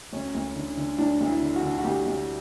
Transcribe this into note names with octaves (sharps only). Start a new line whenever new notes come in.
D2 C#4
D2
D3
D3
D2 D4
D2
E4
D3
F#4
D3
F#4
D2 G4
D2